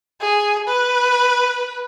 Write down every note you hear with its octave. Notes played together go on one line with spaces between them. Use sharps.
G#4
B4